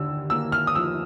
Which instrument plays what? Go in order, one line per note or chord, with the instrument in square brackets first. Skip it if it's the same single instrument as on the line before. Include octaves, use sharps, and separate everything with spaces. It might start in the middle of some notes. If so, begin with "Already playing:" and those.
Already playing: [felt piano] D#2 D3 [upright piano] E6
[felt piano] A#3 [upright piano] E6
[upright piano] F6
D#6
[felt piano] F3 [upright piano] E6